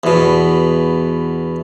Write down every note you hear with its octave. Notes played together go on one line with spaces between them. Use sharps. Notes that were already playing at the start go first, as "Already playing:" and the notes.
E2 B2